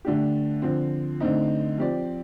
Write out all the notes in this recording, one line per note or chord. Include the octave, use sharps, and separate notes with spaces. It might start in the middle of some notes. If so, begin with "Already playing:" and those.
D3 A3 D4 G4
D3 F3 C4
D3 A3 C4 D#4
F3 C4 G4 D5